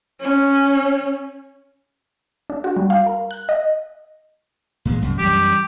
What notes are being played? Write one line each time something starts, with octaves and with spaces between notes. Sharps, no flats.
C#4
D4
F#4
G3
F5
A#4
F#6
D#5
A#2 E3 G#3
C2 F#2
F#2 E3 G3 G4